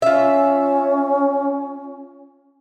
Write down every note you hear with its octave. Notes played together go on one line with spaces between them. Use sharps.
C#4 F4 E5